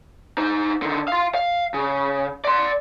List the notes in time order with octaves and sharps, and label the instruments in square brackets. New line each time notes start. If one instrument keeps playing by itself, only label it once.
[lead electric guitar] D#4 C5
D3 D#3
F5 C6
F5
C#3
D5 C6